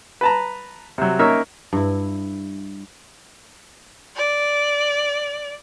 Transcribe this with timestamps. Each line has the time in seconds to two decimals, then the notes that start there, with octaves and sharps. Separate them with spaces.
0.21 B4 A5 A#5
0.98 C3 F#3
1.19 A#3 C#4 D#4 A#4 C#5 E5
1.73 G2 E4
4.16 D5